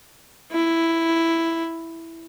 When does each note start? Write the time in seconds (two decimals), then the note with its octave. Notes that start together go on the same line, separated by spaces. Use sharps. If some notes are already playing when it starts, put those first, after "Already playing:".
0.52 E4